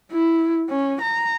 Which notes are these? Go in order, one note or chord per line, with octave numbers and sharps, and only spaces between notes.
E4
C#4
A#5